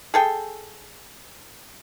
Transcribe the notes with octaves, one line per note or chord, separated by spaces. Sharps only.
G#4 A4 G5